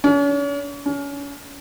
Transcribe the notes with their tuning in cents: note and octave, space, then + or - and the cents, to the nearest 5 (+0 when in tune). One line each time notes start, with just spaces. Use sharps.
C#4 +40
C#4 +30